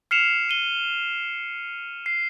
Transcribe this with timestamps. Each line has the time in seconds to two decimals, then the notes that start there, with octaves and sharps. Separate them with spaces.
0.11 F6 C7 C#7 E7 F7
0.49 D#7 G7
2.06 C7